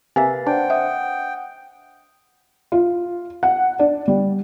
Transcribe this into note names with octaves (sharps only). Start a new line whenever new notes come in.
C3 A#3 B4 E5 F5 G#5 A6
D4 C5 F#5 G5
E5 F#5 D#6
F4
F#5
D4
G3